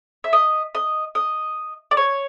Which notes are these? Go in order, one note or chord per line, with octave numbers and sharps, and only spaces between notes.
E5
D#5
D#5
D#5
D5
C#5